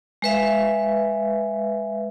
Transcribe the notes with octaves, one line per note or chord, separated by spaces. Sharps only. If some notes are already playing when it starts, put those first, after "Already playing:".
G#3 B4 E5 F5